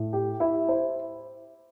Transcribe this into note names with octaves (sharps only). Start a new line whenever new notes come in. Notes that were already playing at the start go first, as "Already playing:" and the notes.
Already playing: A2
G4
E4
C5